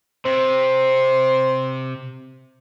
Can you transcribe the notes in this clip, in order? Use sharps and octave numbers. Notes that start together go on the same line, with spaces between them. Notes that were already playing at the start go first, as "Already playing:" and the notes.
C3 C5